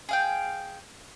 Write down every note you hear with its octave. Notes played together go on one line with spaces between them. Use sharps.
G#4 F5 G5